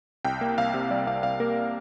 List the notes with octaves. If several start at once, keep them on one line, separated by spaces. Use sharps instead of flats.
C2 G5
A#3
C2 F5
C3
G3 D5
C2 F5
C2 F5
A#3 A#4